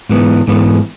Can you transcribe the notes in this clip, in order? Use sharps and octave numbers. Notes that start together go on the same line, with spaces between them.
G#2 E3 B3
G#2 E3 B3